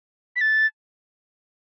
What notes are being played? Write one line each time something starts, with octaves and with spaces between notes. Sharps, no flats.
B6
A6